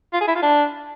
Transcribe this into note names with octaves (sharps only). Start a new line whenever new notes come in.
F4
G#4
E4
F4
D4